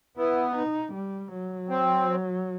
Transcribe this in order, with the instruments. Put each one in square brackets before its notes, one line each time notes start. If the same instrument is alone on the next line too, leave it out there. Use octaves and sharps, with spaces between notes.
[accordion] B3 [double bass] E4
[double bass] D#4
G3
F#3
[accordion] C4